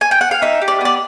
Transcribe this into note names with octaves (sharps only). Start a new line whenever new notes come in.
G#5
G5
F#5
F5
D#4 E5
G4
D5
B3 D5